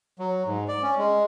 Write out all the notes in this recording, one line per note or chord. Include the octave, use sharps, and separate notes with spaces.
F#3
G#2
D5
C#4
G#3